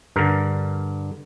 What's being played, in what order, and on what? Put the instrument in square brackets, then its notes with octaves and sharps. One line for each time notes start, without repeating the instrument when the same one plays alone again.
[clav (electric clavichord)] G2 D3 A#4